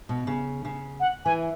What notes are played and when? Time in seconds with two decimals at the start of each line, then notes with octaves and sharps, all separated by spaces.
0.09 B2
0.27 C#3
0.65 C#3
1.00 F#5
1.25 E3 G#5